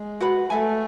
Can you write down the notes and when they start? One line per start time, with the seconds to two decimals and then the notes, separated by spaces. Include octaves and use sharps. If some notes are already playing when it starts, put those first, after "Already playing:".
Already playing: G#3
0.20 F#4 B4 F#5 B5
0.50 A3 A4 E5 G#5